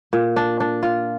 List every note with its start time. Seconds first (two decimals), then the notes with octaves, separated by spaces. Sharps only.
0.13 A#2
0.36 D4
0.60 D4
0.83 F4